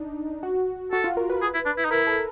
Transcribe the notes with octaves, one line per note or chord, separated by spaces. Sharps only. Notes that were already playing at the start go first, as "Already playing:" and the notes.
Already playing: D4 D#4
F#4
F#4 A4
F4
A#4
B4
G#4
E4
D4
E4
D#4
E4 A#4
A4